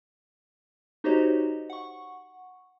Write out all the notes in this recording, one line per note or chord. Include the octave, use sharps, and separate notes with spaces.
D#4 F#4 G4 C5 C#5 D#5
F#5 C#6